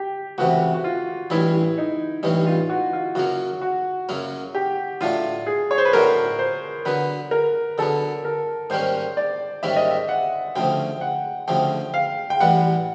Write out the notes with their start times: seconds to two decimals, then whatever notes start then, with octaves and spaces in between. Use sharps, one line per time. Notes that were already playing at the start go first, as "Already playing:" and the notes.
Already playing: G4
0.38 C#2 C3 E3 A3 F#4
0.74 F#4
0.84 F4
1.30 A1 G2 E3 G#3 C#4 E4
1.78 D#4
2.23 A1 G2 E3 G#3 C#4 D#4
2.47 F4
2.70 F#4
2.93 F4
3.15 F#2 C#3 F#3 A#3 F#4
3.62 F#4
4.09 F#2 C#3 F#3 A#3
4.55 G4
5.01 A2 F#3 A3 D4 F4
5.47 G#4
5.71 C#5
5.78 C5
5.85 B4
5.93 A2 F#3 A3 D4 A#4
6.39 C5
6.85 D3 F#3 B3 B4
7.31 A#4
7.78 D3 F#3 B3 A4
8.25 A#4
8.70 G#2 D#3 G3 A#3 C#4 C5
9.17 D5
9.63 G#2 D#3 G3 A#3 C#4 E5
9.77 D#5
9.91 E5
10.09 F#5
10.56 D2 C#3 F3 A3 G5
11.01 F#5
11.48 D2 C#3 F3 A3 G5
11.94 F5
12.30 G5
12.40 A1 A2 E3 G3 F#5